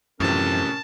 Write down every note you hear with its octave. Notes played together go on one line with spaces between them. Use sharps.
F#2 A2 C3 E3 F3 C#4 A#4 A5